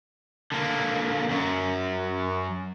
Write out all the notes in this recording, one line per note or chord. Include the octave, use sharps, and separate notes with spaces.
D3 A#3
F#2 F#3